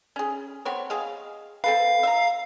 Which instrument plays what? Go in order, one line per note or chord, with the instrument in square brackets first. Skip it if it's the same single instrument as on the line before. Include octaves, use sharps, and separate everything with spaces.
[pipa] C#4 G#4
B3 C4 C#5
G#4 D#5 F5
[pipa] C4 A4 B4 [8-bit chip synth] F5
[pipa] E5 A#5